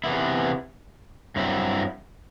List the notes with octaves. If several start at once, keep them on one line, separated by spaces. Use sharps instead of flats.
C3 E3 B3 E4
G2 F#3 C4 E4